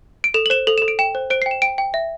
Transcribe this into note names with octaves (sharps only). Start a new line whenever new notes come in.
D7
A4 E7
F#7
C5 E7
A4 F#7
A4 E7
D7
G5 E7
C5
C5 D7
G5 C7
E7
G5 D7
G5
E5